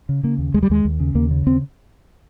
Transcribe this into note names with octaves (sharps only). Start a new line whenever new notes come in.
C#3
C#3 A#3
D#2
D#2 G#3
G3
D#2 G#3
D#2
C#3
D#2 A#3
C#3
D#2 C4